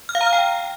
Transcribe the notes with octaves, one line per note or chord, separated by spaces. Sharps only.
F6
F5
A#5
F6
G5